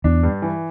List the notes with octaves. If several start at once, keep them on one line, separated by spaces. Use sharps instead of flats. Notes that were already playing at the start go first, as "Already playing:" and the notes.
E2 D4
G2
E3